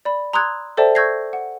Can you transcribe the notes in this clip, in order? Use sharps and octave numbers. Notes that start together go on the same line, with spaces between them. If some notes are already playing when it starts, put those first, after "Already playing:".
D5 B5
A#5 C6 D#6 E6 F#6 G#6
A4 C5 D5 E5 G5 A5
C#6 E6 G6 G#6 A#6 C7
F#5